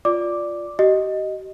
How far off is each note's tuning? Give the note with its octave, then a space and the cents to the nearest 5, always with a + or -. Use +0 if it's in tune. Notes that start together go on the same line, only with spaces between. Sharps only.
F4 +0 D5 +0 D6 +0
G4 -40 D#5 +0